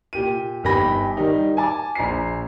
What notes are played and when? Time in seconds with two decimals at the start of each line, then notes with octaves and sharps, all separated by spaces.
0.13 A#2 G4 D#7
0.64 G1 D#3 G4 G#5 B5 A#6
1.17 D#3 G3 D#4
1.57 G#5 A5 D6
1.95 A#1 A#5 C7